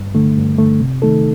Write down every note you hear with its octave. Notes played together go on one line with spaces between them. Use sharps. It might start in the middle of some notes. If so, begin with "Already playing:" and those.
Already playing: G2
D3 A3
G2
D3 A3
C3
D#3 A3 D#4 A4